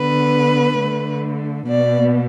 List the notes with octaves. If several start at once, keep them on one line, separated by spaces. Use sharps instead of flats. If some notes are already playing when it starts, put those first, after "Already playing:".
Already playing: D3 B3 B4
D3 A3
B2 B3 D5